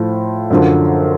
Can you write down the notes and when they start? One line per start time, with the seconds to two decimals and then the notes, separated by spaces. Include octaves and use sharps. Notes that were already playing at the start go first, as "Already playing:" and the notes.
Already playing: A2 F3
0.50 F#2 D3 F3